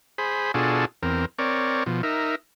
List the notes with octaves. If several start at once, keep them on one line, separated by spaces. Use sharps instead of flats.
G#4 C5 B5
B2 D4 F4 F#4 G#4 A4
E2 C4 A#4
C4 A#4 C#5 D5
B2 F3
D#4 A#4 E5